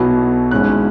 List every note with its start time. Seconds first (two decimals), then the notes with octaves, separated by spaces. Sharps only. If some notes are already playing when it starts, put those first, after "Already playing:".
Already playing: B1 B2 F#3 B3 E4
0.51 G#1 G#2 G#3 C#4 E4 F#6